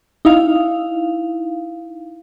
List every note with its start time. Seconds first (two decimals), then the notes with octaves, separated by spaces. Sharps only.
0.25 D#4 E4 F5